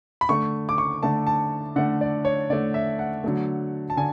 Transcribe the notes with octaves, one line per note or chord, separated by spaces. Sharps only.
B5
D3 A3 C#6
D6
C#6
D3 A3 A5
A5
D3 A3 F#5
D5
C#5
D3 A3 D5
E5
F#5
D3 F#3 A3
A5
D3 G#5